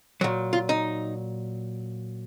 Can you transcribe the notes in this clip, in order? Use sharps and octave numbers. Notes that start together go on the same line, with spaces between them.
A#2 F#3 F#4
F4
D#4